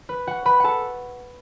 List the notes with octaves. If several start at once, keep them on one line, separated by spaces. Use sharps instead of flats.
B4
F#4 F#5
B4 B5
A4 F#5 A5